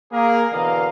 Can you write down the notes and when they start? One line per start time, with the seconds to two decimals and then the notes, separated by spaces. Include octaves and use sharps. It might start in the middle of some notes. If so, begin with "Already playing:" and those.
0.12 A#3 G#4 A#4
0.52 B2 D3 E3 A#4 D#5 F5